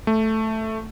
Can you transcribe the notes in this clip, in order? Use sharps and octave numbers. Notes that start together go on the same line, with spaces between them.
A3